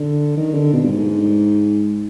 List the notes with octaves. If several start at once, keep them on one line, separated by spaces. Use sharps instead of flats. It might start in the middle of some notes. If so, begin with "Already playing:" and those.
Already playing: D3
D#3
D3
B2
G2
G#2